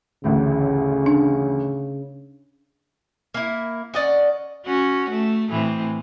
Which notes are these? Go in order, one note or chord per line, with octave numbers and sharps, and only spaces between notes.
A1 D2 A2 C#3
D4
A#3 E4
C#4 D5 D#5 F#5
C#4 F#4
A3
A2 E3 C4